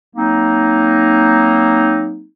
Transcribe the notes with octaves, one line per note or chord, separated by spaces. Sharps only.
F#3 A#3 C4 D#4